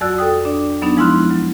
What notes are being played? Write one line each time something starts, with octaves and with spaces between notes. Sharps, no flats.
F2 F#3 F#4 D5 E6 F#6
A4 G5 D#6
D4 D5
F#3 B3 D4 D#4
F3 G#3 E4 C6 F6 F#6
F#3